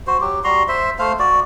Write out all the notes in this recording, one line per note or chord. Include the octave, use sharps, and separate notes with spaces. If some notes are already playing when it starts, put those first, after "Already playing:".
F#4 C5
F#3 G4
G3 F#4 A#5 C6
C5 E5
A3 C5 F5
F#4 D5